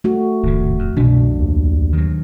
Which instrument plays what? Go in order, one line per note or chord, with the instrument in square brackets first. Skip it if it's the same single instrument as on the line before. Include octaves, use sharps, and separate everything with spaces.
[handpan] A3 F#4
[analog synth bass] D1 [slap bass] G#1 D#2 C#3
[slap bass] F2
[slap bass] C2 F#2 E3 [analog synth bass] B2 [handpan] D4
[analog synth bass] D#2
[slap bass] D#3 F#3